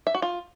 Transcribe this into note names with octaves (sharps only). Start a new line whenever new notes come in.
E5
F#4
F4